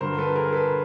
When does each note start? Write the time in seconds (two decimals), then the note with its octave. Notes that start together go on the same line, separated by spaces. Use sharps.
0.01 G2 D3 F#3 A#4 C5
0.18 A4 B4
0.35 G#4 A#4
0.53 A4 B4